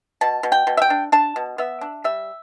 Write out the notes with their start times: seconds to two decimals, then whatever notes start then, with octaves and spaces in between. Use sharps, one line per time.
0.21 B2 A5
0.43 B2
0.52 G5
0.67 B2
0.77 E5
0.82 G5
0.90 D4
1.12 D4 A5
1.36 B2
1.58 B3 E5
1.81 D4
2.04 G3 E5